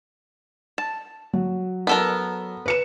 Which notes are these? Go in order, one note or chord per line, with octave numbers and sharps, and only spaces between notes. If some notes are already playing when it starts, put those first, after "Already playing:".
A5
F#3
B3 A4 A#4
B4 C#7 E7